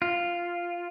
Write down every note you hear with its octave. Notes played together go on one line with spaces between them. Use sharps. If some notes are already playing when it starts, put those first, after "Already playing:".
F4